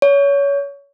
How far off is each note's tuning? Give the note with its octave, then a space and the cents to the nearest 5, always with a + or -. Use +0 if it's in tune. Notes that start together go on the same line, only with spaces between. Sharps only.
C#5 +25